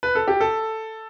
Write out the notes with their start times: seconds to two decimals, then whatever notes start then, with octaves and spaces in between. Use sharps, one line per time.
0.03 B4
0.15 A4
0.28 G4
0.40 A4